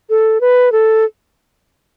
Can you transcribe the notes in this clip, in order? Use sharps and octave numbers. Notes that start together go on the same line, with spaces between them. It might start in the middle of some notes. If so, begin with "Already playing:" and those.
A4
B4
A4